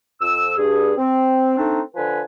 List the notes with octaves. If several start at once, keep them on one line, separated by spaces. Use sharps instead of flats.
F2 E6
G2 G#4
C4
A3 C4 D4 D#4
D3 F3 B4 G#5